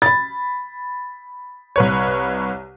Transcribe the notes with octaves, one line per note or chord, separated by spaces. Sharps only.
B5 A6
C2 B4 C#5